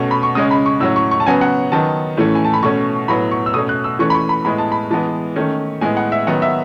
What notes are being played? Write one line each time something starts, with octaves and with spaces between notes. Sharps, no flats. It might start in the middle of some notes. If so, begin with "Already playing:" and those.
Already playing: B2 A3 C#4 C#6
B5
C#6
C#3 G#3 C#4 D#6
B5
C#6
A2 F#3 C#4 E6
C#6
C#6
A5
C#3 F#3 B3 G#5
F#5
D#3 F#3 B3 A5
A2 E3 A3 C#4
G#5
A5
B5
B2 A3 C#4 C#6
A2 F#3 B3 B5
C#6
E6
B2 A3 C#4 D#6
F#6
E6
E3 A3 C#4 C#6
B5
C#6
B5
A2 G#3 B3 B5
A5
B5
E3 G#3 B3 A5
D#3 A3 C#4
A2 G#3 B3 G#5
F#5
E5
D#3 F#3 B3 F#5
E5